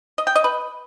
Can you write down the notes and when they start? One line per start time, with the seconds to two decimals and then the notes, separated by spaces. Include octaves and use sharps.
0.18 D#5
0.27 G5
0.35 D#5
0.44 B4